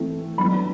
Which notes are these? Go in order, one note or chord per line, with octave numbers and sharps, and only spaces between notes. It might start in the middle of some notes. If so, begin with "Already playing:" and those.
Already playing: E3 A3 C4 E4
F#3 B3 D4 B5